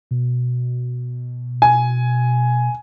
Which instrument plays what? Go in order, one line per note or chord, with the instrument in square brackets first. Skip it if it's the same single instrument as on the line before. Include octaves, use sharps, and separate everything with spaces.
[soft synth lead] B2
[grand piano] G#5